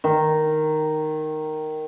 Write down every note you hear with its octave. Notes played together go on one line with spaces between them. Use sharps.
D#3